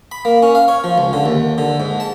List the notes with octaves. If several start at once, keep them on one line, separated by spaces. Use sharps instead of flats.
B5
A#3
C#4
F5
C#5
F3
C#2
D3
D#2
D3
G#2
A5